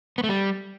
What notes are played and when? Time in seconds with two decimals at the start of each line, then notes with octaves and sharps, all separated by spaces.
0.18 B3
0.24 A3
0.29 G3